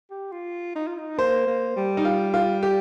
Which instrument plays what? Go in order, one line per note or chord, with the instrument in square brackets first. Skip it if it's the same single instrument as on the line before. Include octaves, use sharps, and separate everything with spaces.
[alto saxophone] G4
F4
D#4
F4
D#4
[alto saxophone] A#3 [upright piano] C5
[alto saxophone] A#3
G3
[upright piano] D#4
F4
F4
G4